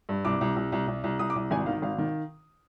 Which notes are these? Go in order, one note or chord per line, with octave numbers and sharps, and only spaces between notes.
G2
C2 D6
C2
C2
C2
C2
C2
C2 D#6
D6
C2
G#1 G#5
D#3 F5
G#1 F5
D#3